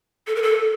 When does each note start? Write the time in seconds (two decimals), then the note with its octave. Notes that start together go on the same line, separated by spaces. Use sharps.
0.27 A4
0.36 A#4
0.43 A4